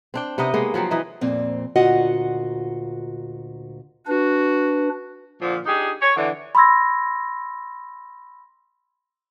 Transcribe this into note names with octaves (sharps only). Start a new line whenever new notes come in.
C4 D4 G5
C3 B3 D#4 D#5
G#3 A#3 B3
F3 F#3 B3 C4
E3 D#4 D#5 E5
F2 A#2 C4
D2 A#2 F4 F#4 D#5 F#5
D4 F#4 B4
A#2 D3 F3
D4 D#4 G4 G#4
C#5
D3 E3
B5 C6 D6 E6 G#6 A#6